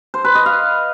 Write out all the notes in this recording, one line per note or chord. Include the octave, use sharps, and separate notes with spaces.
C5
B4
D#5
F5